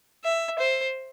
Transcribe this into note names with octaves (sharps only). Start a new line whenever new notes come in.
E5
C5